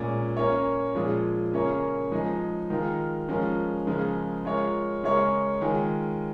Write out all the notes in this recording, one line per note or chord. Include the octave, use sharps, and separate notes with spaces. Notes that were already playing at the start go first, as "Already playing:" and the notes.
Already playing: A#2 G#3 C#4
A#3 C#4 A#4 C#5
A#2 F3 G#3 F4 G#4
C#3 A#3 C#4 A#4 C#5
F3 G#3 D#4 G#4
D#3 G#3 F4 A#4
F3 G#3 C#4 F4 A#4
C#3 F3 G#3 F4 A#4
G#3 F4 A#4 C#5
C#3 G#3 C#4 A#4 C#5
D#3 G#3 F4 G#4